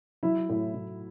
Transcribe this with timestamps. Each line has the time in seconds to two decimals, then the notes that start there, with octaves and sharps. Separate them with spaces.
0.23 F#3 E4
0.49 A2
0.74 A2